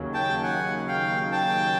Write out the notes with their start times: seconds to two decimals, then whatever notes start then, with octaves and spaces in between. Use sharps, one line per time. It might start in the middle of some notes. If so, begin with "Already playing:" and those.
Already playing: D#2 C#3 F#3
0.14 G5 A5
0.43 F#5 G#5
0.87 F5 G5
1.32 G5 A5